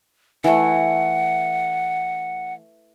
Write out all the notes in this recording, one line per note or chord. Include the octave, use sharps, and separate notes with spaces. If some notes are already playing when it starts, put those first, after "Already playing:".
E3 A3 F#5